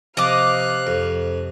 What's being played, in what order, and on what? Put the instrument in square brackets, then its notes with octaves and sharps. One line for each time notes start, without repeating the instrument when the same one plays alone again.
[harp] C3 [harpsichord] F3 [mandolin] D#5 D6 [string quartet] F5 F#6
[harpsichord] F2